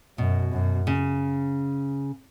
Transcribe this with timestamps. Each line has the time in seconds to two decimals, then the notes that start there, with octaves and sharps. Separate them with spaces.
0.18 F#2 B2
0.52 F#2
0.87 C#3